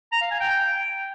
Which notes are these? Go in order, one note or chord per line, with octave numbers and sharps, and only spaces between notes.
A#5
F5
G#5
G5